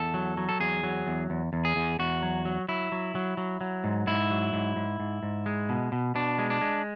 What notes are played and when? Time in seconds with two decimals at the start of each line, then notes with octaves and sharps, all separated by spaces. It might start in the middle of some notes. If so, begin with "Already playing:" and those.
Already playing: E2 A4
0.14 F#3
0.37 F#3
0.49 A4
0.60 E2 G#4
0.83 F#3
1.07 E2
1.30 E2
1.53 E2
1.65 G#4
1.76 E2
1.99 E2 F#4
2.22 F#3
2.45 F#3
2.68 F#3 E4
2.92 F#3
3.15 F#3
3.37 F#3
3.61 F#3
3.84 G#2
4.07 G#2 E4
4.30 F#3
4.53 G#2
4.76 G#2
5.00 G#2
5.23 G#2
5.46 G#3
5.69 B2
5.92 B2
6.15 B2 D4
6.39 G#3
6.50 D4
6.61 G#3